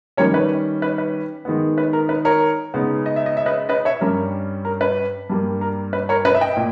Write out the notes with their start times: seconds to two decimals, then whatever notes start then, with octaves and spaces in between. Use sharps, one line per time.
0.17 D#3 G3 C#4 A#4 C#5
0.34 B4
0.82 B4
0.98 B4
1.45 D#3 G#3 B3
1.78 B4
1.93 A#4
2.09 B4
2.25 A#4 C#5
2.74 C#3 G#3 B3 D#4
3.06 D#5
3.16 E5
3.26 D#5
3.37 E5
3.46 B4 D#5
3.69 B4 D#5
3.85 C#5 E5
4.01 G2 G3 C#4 A#4
4.65 A#4
4.81 B4
5.30 G2 G3 A#3
5.61 A#4
5.93 B4
6.09 A#4 C#5
6.25 B4 D#5
6.35 E5
6.41 D#5 G5
6.57 A#2